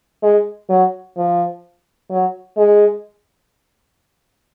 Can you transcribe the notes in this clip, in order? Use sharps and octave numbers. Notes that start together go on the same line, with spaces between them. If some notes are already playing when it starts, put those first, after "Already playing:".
G#3
F#3
F3
F#3
G#3